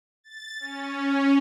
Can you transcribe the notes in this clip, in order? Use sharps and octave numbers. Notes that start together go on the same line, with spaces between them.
A6
C#4